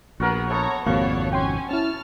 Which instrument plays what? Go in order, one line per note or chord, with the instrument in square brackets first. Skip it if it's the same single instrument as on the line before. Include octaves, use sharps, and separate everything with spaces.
[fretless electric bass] A#1 [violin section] B3 G#4 [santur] F#4 A#4 F#5
[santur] A3 B3 [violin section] C#5 A#5
[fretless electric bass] G#1 F2 C3 [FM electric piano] A#3 F5 [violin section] D4 C#5 [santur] F#4
[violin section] C#4 G#5 [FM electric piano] G5 C6
[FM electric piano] C#4 E4 [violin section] A5 F6